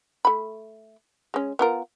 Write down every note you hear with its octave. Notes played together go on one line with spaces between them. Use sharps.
A3 B5
G#3 C#4
B3 F4 A#4